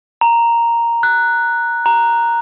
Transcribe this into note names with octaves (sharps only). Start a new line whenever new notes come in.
A#5
F#6
A#5